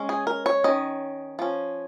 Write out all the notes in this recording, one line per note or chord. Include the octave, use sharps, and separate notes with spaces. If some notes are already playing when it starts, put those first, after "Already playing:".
Already playing: G#3 C#4
G#4
A#4
C#5
D#3 C#4 D#5
F3 C#4